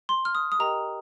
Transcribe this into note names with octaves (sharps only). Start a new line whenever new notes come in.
C6
F6
D#6
D#6
G4 A#4 D#5 G5 A#5